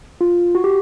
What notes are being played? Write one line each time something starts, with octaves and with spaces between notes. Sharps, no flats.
F4
F#4
G4